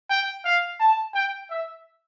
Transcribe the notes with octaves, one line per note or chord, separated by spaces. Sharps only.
G5
F5
A5
G5
E5